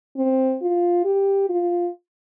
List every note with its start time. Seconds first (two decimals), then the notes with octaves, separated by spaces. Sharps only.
0.17 C4
0.62 F4
1.05 G4
1.49 F4